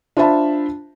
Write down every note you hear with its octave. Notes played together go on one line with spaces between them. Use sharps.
D4 F4 C5 E5 A5 B5